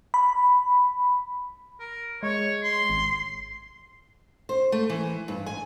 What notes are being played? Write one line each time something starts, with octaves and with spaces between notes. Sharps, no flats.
B5
A#4
G#3 C#5
C6
G#1
C5
A3
E3
G2
G#5